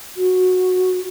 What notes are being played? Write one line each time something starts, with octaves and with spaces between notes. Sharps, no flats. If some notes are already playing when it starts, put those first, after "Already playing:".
F#4